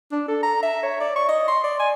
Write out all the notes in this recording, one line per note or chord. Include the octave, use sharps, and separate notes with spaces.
D4
A4
A#5
E5
C#5
D5
C#6
D#5
C6
D5
G#5